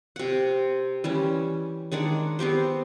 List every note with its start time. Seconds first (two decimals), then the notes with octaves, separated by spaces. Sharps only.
0.16 C3 F#5
1.04 E3 G3 C#4
1.92 D#3 G#3 D4 F#5
2.39 B3 C4 G4 C5